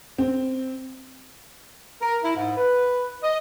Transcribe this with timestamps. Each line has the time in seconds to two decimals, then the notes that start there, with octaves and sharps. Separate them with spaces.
0.18 C4
2.02 A#4
2.23 E4
2.36 G#2
2.58 B4
3.23 D#5